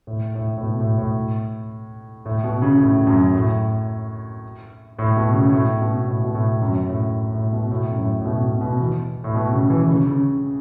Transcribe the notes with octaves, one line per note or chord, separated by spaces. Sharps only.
A2
A2
A2
B2
A2
A2
A2
B2
C#3
A2
F#2
A2
A2
B2
C#3
A2
B2
A2
B2
A2
F#2
A2
A2
B2
A2
F#2
A2
A2
B2
B2
B2
E3
A2
B2
C#3
E3
E3
C#3
C#3